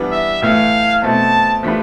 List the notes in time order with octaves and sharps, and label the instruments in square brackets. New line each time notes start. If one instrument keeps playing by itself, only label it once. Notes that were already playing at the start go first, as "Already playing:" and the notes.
Already playing: [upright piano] E3 G3 B3 D4
[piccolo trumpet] E5
[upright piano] A2 E3 A3 [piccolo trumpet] F5
[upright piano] B2 A3 C4 [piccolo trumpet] A5
[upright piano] F3 A3 D4 G4 B4